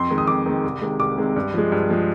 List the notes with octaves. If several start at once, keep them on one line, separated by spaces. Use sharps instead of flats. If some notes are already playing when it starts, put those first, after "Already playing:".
Already playing: F2 C6
D#3 G#3
D#6
F2 D6
D#3 G#3
C2
C3 D#3 G#3
C2 D6
C3 D#3 G#3
G2
F3 G#3
G2
F3 G#3